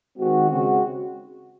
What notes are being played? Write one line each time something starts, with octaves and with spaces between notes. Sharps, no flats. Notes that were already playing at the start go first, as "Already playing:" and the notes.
D#3 G#3 C4 F#4
C#3 G#3 C4 F#4